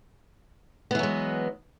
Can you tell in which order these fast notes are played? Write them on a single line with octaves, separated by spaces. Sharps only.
B3 E3 F#3 G#3